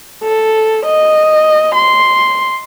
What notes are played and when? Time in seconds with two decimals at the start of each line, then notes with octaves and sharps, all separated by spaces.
0.23 A4
0.85 D#5
1.75 C6